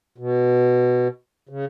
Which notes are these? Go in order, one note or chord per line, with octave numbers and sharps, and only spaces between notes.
B2
C#3